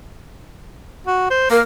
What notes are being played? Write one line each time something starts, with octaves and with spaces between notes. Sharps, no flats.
F#4
C5
A#3 A#4